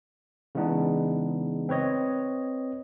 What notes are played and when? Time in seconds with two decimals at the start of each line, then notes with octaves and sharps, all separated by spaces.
0.55 C#3 E3 G#3 B3 D4 D#4
1.69 C4 B4 C#5 D#5